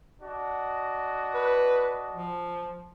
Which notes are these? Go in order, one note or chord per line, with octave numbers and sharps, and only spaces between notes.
D4 F#4 D#5
B4
F3